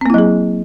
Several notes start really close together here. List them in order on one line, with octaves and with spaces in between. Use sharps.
C4 A#3 E4 F#3 G#4